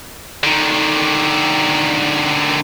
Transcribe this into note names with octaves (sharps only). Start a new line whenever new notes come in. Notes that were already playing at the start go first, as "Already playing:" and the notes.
D3 D#3